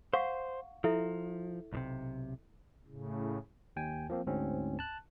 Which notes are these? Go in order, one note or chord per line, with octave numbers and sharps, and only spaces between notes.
C5 F5 F#5 C#6
F3 E4 A4 E5
B1 A2 C3
A2 C#3
D#2 G5 G#5
F3 A#3 C4
D2 G#2 C4 C#4
A5 F#6